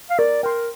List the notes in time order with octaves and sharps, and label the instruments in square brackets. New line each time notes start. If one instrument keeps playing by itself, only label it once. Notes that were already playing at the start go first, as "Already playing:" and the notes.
[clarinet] F5
[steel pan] A#4 [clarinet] D5
[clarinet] A#4 [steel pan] G5 C6